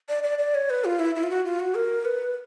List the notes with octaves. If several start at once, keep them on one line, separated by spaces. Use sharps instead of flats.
D5
D5
D5
C#5
B4
F4
E4
E4
F4
F#4
F4
F#4
A#4
B4